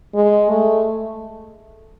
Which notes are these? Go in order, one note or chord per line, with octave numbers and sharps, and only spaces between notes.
G#3
A3